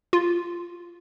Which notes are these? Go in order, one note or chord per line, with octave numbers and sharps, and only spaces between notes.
F4